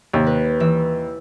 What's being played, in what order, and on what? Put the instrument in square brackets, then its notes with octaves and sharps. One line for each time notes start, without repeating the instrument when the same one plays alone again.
[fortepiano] D#2 [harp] C3
[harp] B4
E3 E5